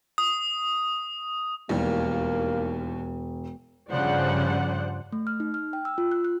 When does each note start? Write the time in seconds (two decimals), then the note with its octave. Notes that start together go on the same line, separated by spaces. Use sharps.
0.18 D#6
1.69 E1 D#2 E3 G3 A#3
3.91 G2 C#3 F3 C5 D5 F#5
5.12 A3
5.27 F6
5.40 D#4
5.54 F6
5.73 G5
5.85 E6
5.98 F4
6.12 F#6
6.25 F#6